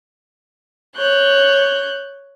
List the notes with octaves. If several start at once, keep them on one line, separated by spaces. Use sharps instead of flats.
C#5 F#6 G6